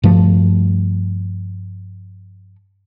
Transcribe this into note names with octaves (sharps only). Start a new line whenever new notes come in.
G2 F3 A3